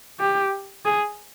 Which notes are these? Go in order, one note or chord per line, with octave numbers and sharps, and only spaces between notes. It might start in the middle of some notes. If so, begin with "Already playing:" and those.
G4
G#4